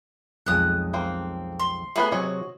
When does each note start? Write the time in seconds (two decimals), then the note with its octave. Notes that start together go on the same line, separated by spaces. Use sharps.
0.46 B1 F2 G#3 D#6 F#6
0.94 A#3 C4
1.60 C6
1.96 A3 B3 G#4 B4
2.12 C3 F#3 F#4 C#5 D#5